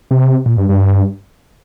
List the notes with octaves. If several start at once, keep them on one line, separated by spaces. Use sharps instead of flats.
C3
A#2
G2
G2